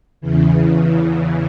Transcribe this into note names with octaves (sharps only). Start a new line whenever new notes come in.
E2 C#3 E3